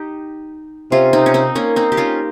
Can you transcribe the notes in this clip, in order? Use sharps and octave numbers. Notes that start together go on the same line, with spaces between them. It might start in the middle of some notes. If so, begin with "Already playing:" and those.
Already playing: D#4 G4
C3 C#4 F4
C4 D#4
C#4
C4 D#4
A#3 C#4
C4 D#4
G4
C#4 F4